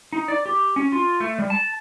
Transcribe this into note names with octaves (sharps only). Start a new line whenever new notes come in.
D#4
D5
G4
C#4
F4
A3
G3
A5